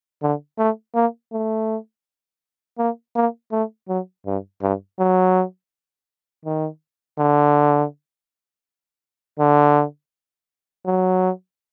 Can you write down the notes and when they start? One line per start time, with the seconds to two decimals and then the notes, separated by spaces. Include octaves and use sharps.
0.22 D3
0.58 A3
0.95 A#3
1.32 A3
2.78 A#3
3.15 A#3
3.52 A3
3.88 F#3
4.26 G2
4.62 G2
4.99 F#3
6.45 D#3
7.18 D3
9.39 D3
10.86 F#3